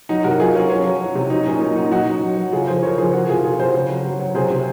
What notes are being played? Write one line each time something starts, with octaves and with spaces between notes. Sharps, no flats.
F#3 D#4
C3 F#4 A#4
F#3 F4 G#4
F#3 C#4 F4
F#3 C#4
F#3
F#3
C3
F#3 D#4
A#2 C#4
A#2 D#4
F#3 D#4
F#3 D#4 F#4
F#3
F#3
F#3
C#3 F4 G#4
F3 G#4 C5
C#3 A#4 C#5
F3 G#4 C5
F3 F#4 A#4
C3 F4 G#4
C3 F4 G#4
C3 G#4 C5
C#3
F#3
F#3
F#3
C3 G#4 C5
C3